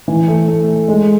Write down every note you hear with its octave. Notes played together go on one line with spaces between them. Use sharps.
E3
A3
A3
A3
G#3